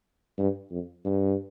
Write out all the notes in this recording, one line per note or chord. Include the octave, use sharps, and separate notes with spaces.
G2
F2
G2